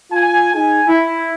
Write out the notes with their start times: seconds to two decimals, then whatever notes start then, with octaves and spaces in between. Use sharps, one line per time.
0.11 F4 G#5
0.53 D#4 G#4 G#5
0.87 E4